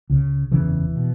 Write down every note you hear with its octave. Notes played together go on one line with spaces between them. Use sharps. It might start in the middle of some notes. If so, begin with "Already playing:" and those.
C#2 C#3
F#1 E2 C#3 E3
B2